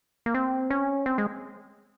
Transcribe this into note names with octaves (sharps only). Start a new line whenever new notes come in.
A#3
C4
C#4
C4
G#3